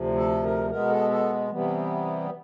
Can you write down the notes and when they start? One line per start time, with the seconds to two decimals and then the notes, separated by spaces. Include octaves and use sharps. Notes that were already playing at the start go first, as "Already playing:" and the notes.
Already playing: D2 C3 F3
0.17 A4
0.43 A#4
0.70 B2 G#3 B3 A#4
0.90 A4
1.10 A4
1.50 C3 E3 G3 B3